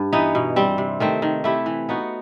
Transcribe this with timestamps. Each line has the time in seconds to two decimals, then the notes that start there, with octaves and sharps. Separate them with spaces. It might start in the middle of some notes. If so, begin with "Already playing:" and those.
Already playing: G2
0.13 E3 B3 D#4
0.35 B2
0.56 G3 C4
0.78 C3
1.00 D#3 A3 C4
1.22 D#3
1.44 A3 E4 G4
1.66 E3
1.89 B3 D#4 F#4